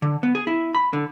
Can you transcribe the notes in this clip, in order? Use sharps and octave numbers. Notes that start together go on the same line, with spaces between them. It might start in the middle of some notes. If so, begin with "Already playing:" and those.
D3
B3
G#4
E4
B5
D3